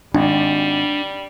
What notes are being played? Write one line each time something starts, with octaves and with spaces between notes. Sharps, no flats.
G#1 G3 D4